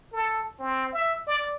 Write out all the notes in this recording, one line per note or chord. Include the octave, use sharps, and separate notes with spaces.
A4
C4
E5
D5